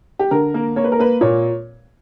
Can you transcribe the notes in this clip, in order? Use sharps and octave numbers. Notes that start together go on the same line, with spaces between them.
G4
D3 A#4
A#3
A#3 C#5
B4
A#4
A#3 B4
A#2 C#5